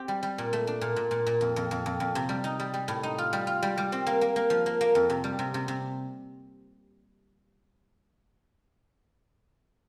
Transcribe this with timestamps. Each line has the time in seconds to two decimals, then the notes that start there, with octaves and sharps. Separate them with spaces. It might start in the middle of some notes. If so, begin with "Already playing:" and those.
Already playing: C4 G4
0.08 G3
0.23 G3
0.38 A#2
0.53 A3
0.67 D4
0.81 A#2
0.96 A#2
1.11 A#2
1.26 A#2
1.41 F2
1.56 F2
1.71 F2
1.86 F2
2.00 F2
2.15 C3
2.29 G3
2.44 D#4
2.60 G3
2.74 G3
2.88 A2
3.03 D#4
3.18 F4
3.33 G3
3.47 F4
3.63 G3
3.78 G3
3.92 C4
4.07 A#3
4.21 A#3
4.36 A#3
4.50 F3
4.66 A#3
4.81 A#3
4.95 F2
5.10 C3
5.24 G3
5.39 C3
5.54 C3
5.68 C3